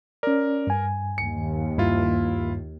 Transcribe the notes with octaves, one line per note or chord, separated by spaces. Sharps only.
C#4 A#4 D5
G2 G#5
D#2 C#7
G2 E4 F4